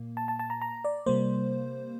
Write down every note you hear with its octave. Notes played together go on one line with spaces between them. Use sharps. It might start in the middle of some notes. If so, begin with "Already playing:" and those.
Already playing: A#2 A#3
A5
A5
A5
A#5
A#5
D5
C3 G3 A#3 C5